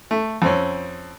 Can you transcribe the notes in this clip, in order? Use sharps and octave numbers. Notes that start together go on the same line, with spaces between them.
A3
F2 C4 C#4